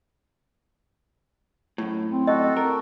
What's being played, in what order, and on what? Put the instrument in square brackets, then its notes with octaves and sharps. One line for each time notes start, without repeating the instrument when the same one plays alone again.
[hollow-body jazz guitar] F#2 A2
[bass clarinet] C4
[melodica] F#4 A4 [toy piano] D#5
[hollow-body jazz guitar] A#4